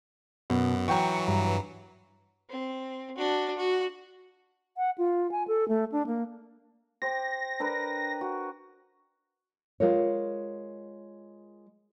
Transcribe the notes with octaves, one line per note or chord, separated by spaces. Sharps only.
F#2 B2 B3
E3 F#3 F#5 G5 A#5 C#6
G2 A#5
C4
D4 F#4
F#4
F#5
F4
G#5
A4
A3
D4
A#3
G4 C5 A#6
D4 A#4 B4
F#4
G#3 F4 A#4 C#5